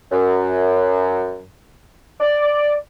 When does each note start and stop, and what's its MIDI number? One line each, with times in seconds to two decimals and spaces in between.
0.12 1.41 42
2.20 2.74 74